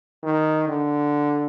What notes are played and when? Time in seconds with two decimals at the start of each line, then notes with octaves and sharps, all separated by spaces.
0.23 D#3
0.68 D3